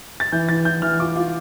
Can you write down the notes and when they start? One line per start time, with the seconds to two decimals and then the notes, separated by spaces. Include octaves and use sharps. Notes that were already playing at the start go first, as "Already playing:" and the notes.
0.20 A6
0.32 E3 G6
0.49 E3 A6
0.65 E3 G6
0.82 E3 F6
0.99 F4 D6
1.16 F4